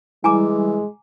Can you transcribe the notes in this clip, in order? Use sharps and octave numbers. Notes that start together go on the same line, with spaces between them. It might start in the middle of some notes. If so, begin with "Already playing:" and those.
E3 G3 G#3 E4 G#5 A#5 D6